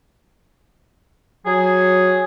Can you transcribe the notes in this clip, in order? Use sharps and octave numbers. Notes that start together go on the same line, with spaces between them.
F#3 G#4